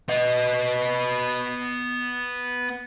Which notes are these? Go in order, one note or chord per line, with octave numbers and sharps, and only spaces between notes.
B3 D#5